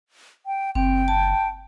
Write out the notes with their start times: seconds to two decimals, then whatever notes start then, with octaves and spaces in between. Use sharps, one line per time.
0.46 G5
0.75 F#1 C4 G5
1.08 A5